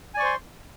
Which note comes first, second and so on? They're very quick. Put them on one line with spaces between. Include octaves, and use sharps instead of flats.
G#5 D5 C#6 C5 C6